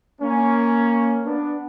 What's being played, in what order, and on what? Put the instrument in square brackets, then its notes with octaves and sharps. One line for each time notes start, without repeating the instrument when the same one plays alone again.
[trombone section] A#3 C#4
B3 D4